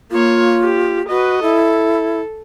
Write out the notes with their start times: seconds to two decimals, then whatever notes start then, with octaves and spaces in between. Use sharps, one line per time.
0.11 A#3 F4 C#5
0.62 G4
1.09 F#4 B4 D#5
1.43 E4 A4